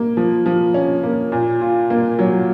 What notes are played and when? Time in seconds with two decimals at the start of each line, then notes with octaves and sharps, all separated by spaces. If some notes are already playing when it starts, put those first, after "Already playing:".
Already playing: A#3
0.17 F3
0.46 F3
0.74 C#4
1.03 A#3
1.32 A#2
1.61 F4
1.90 A#3
2.19 F#3